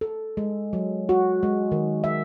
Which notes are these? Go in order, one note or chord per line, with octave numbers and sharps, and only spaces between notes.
A4
G#3
F#3
F#4
G#3
D#3
E5